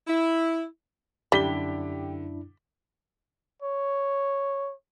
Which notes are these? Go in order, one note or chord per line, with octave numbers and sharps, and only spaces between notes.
E4
F#2 D3 G3 D4 E4 G4 B6 G7
C#5